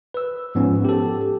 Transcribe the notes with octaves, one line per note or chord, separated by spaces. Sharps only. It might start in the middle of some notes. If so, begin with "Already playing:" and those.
B4 E6
G#2 F3 B3 C#4
G4 A4